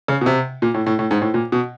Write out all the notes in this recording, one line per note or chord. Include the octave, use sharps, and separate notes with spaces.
C#3
B2
C3
A#2
A2
A2
A2
G#2
A2
A#2
B2